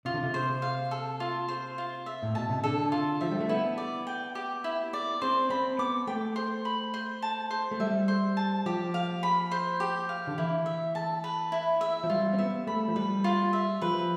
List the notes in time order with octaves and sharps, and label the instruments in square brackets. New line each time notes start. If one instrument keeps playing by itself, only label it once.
[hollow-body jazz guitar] C3 [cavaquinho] F4
[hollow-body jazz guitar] D3
C3
[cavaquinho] C5
F5
A4
F4
C5
F4
E5
[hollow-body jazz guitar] A2
[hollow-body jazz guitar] B2 [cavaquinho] A5
[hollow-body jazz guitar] C3
[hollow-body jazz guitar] D3 [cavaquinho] A4
[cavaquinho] F4
[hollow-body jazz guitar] F3 [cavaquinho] E5
[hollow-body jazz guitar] G3
A3
[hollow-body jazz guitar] B3 [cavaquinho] E4
[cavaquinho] D5
G5
G4
E4
D5
[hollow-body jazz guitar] C4 [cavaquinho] C5
[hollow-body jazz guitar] C4 [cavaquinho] B5
[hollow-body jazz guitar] B3 [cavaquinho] D6
[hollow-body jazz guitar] A3 [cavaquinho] G5
[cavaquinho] C5
B5
C5
A5
C5
[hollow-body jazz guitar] A3
[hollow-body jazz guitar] G3 [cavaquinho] E5
[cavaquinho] C5
A5
[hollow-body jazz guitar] F3 [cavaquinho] G4
[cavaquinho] F5
B5
C5
G4
F5
[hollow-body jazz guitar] D3
[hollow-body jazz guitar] E3 [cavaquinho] E4
[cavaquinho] E5
A5
B4
E4
E5
[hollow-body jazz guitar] F3
[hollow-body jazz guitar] G3 [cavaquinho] F4
[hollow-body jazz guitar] C4
[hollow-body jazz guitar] B3 [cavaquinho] E5
[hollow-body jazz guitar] A3 [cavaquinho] B5
[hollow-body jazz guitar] F3
[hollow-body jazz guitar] G3 [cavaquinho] B4
[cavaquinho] F4
E5
[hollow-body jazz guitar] F3 [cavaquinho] B4